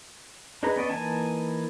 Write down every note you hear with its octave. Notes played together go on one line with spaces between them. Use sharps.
D4 D#4 G#4 B4 A#5
B3 C#4 D5 D#5
E3 A#3 D#4 G#5 A5